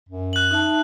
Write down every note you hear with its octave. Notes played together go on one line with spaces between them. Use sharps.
F#2
F#6 F#7
D#4 E5 A5 F#6